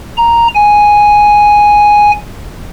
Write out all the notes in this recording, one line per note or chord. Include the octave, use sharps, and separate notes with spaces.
A#5
G#5